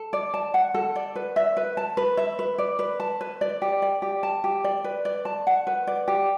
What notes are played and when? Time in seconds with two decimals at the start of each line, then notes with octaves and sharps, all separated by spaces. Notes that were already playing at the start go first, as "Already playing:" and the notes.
Already playing: A4
0.13 D5
0.34 A5
0.54 F#5
0.74 A4
0.96 D5
1.16 B4
1.36 E5
1.57 B4
1.77 A5
1.97 B4
2.17 E5
2.39 B4
2.58 D5
2.79 B4
3.00 A5
3.21 B4
3.41 D5
3.62 G4
3.82 D5
4.02 G4
4.23 A5
4.44 G4
4.64 D5
4.84 B4
5.05 D5
5.25 A5
5.47 F#5
5.67 B4
5.87 D5
6.08 G4